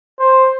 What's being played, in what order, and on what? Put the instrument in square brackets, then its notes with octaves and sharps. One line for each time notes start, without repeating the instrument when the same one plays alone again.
[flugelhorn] C5